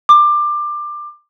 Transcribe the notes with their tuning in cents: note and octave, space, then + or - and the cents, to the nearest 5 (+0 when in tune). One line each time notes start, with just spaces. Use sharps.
D6 +20